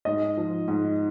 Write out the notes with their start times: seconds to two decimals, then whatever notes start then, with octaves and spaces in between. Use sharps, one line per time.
0.05 G#2 D#5
0.37 F3
0.68 G#2